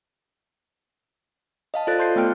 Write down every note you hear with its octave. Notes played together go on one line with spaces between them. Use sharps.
D#5 F5 A5
F4 A4 C5 D5 F#6 A6
A5 C6 G6 A6 C7
A3 B3 G5 F6 D7